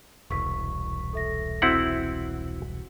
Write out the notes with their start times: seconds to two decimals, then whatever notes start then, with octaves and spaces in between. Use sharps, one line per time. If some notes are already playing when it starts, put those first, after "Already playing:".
0.30 E1 C2 C#6 B6
1.13 A4 E5 A#6
1.62 C4 E4 F#4 F#5